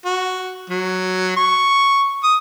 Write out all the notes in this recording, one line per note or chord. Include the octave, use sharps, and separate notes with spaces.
F#4
F#3
C#6
D#6